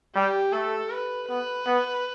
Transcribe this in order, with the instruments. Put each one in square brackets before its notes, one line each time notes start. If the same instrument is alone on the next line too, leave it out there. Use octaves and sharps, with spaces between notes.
[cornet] G3 [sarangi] G4
[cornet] A3 [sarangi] A4
[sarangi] B4
[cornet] B3 [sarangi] B4
[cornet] B3